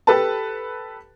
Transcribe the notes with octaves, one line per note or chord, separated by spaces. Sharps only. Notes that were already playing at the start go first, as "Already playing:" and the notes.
G4 A4 B4 A5